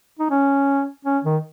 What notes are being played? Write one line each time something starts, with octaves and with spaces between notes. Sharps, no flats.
D#4
C#4
C#4
D#3